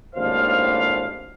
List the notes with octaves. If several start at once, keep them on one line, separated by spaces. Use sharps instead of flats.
G#1 D#2 A2 D4 C5 F5